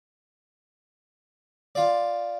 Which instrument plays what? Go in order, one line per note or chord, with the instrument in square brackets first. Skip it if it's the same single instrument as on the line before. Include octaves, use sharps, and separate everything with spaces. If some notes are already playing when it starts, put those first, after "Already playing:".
[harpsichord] F4 D5